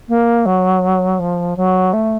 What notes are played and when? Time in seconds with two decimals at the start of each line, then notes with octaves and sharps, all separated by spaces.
0.08 A#3
0.46 F#3
1.19 F3
1.57 F#3
1.93 A3